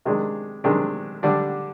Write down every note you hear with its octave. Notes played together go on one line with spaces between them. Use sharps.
C3 D#3 G#3 D4 G#4
C3 D#3 G#3 D4 G#4
D3 G3 D4